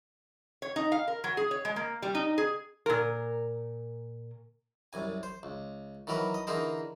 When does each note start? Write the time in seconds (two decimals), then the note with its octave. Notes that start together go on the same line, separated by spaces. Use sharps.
0.62 C#5
0.76 D#4
0.92 F5
1.08 A#4
1.24 F#3
1.37 G#4
1.51 C#5
1.65 G#3
1.76 A#3
2.02 G3
2.15 D#4
2.38 G#4
2.86 A#2 A#4
4.93 C2 F#2 G#5
5.23 C5
5.43 C#2
6.07 D#3 E3 F#3 A#4 B4
6.34 D#5
6.47 D3 E3 D#4 G#4 A#4 C5